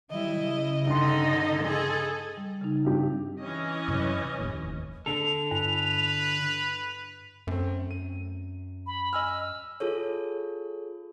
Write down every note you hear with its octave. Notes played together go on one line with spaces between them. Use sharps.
D#3 F#3 G3 E4 D#5
C#3
G2 D3 D#4 D#5 C6
G#4 A4
G3
C#3 D#4
G2 C3 G4
E3 C#4 D#5
F#2 C3 F#3
F1 D#2 A2
D3 A4 F7
G2 B4
F#2 A3 C4
D#7
B5
D#5 G#5 E6 F6
F4 G#4 A4 C#5